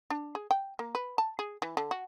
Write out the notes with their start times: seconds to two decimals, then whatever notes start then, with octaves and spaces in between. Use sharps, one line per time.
0.10 D4
0.35 G#4
0.51 G5
0.79 A#3
0.95 B4
1.18 A5
1.39 G#4
1.62 E3
1.77 D3
1.91 F#4